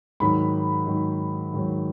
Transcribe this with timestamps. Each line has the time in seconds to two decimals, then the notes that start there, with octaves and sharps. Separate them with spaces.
0.20 G#2 D#3 F#3 B5
0.86 G#2 D#3 F#3
1.53 G#2 D#3 F#3